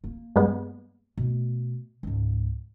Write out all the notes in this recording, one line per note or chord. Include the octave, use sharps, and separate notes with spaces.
A#3
G2 G#3 B3
B2 A3
C#2 G#2